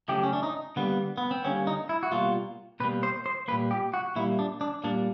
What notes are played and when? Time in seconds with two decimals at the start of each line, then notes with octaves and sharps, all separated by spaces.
0.08 C#3 F#3 A3 G4
0.23 C#4
0.33 D4
0.43 D#4
0.76 D3 G3 A#3 B3
1.18 B3
1.31 C4
1.44 D3 G3 A#3 C#4
1.67 D#4
1.89 E4
2.03 F#4
2.12 B2 G3 A#3 F4
2.80 B2 G3 A#3 B4
3.03 C5
3.26 C5
3.48 A#2 G3 A#3 B4
3.71 G4
3.94 F#4
4.16 A#2 G3 A#3 E4
4.39 D4
4.61 D4
4.84 A#2 G3 A#3 D4